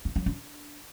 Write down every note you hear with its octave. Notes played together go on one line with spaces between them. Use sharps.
F4
F#3
D4